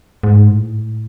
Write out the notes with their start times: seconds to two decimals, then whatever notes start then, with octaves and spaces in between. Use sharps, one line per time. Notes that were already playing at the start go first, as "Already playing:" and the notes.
0.23 G#2
0.47 A2